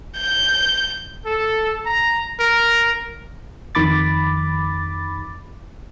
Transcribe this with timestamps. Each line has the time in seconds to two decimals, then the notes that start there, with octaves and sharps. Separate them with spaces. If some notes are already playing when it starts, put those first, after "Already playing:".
0.17 G6
1.26 A4
1.86 A#5
2.40 A#4
3.75 F2 D#3 B5 D6 A6